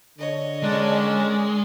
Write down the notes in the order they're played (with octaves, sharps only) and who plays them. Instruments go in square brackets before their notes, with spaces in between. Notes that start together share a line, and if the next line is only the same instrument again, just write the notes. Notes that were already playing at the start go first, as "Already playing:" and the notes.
[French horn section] D3 [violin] C#5 D#5
[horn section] D#3 C#4 D4 [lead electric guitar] G#3